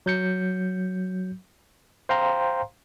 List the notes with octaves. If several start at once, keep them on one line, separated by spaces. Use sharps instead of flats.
F#3 G6 C#7
C5 F5 G5 A#5 C6